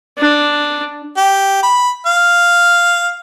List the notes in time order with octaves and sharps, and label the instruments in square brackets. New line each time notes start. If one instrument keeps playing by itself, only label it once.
[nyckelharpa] D4
[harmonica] G4
B5
F5